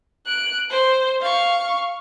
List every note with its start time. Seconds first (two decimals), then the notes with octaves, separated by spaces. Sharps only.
0.27 F#6 D7
0.70 C5
1.21 F5 C#6